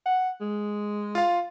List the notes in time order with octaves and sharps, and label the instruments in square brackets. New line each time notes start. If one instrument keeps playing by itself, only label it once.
[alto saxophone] F#5
G#3
[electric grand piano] F4 F5